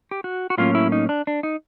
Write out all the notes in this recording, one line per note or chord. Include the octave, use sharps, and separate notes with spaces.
G4
F#4
F#4
A2 F#3 A#3 C#4 F4
E4
D#4
D4
D4
D#4